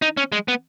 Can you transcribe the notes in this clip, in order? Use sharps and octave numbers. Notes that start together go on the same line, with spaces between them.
D#4
C#4
G#3
B3